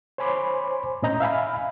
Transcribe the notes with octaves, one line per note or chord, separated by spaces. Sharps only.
C5 C#5 G#5 B5 C6 D6
A2 C#4 D#5 A#5 G6
E5 F5 G#5 B5